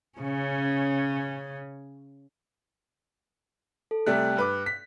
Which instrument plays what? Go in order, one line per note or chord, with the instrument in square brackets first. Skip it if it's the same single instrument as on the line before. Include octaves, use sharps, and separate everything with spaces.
[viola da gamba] C#3 C#4
[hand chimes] A4
[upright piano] C3 G3 A3 [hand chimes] F#6
[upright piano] G2 B4 D6
B6